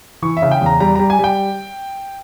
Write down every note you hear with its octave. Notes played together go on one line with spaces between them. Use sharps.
E3 C#6
E5
C#3
G5
E2 A#5
G3 A#5
G3 A#5
G#5
G3 G5